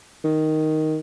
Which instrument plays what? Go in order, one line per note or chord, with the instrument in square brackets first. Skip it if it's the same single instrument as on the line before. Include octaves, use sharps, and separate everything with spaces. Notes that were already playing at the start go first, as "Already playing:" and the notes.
[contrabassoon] D#3